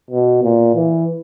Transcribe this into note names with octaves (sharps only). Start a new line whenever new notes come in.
B2
A#2
E3